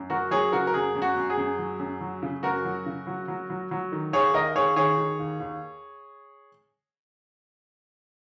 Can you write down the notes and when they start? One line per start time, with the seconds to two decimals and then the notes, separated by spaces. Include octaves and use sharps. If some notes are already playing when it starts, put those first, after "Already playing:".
Already playing: F#2
0.10 F#3 F#4 A#4
0.31 F#3 G#4 C#5
0.52 C#3 F#4 A#4
0.67 A#4
0.74 F#2 G#4
0.95 F#2
1.02 F#4
1.17 F#2
1.30 G#4
1.38 F#2
1.59 F#3
1.80 F#2
2.01 F#3
2.23 C#3
2.43 F#2 F#4 A#4
2.65 F#3
2.86 C#3
3.07 F#3
3.28 F#3
3.50 F#3
3.71 F#3
3.92 D#3
4.13 D#2 G#4 C#5
4.34 D#2 A#4 D#5
4.55 D#2 G#4 C#5
4.76 D#3 G#4 C#5
4.98 D#3
5.19 D#2
5.40 D#2